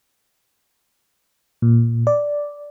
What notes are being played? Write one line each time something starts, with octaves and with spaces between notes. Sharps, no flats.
A#2
D5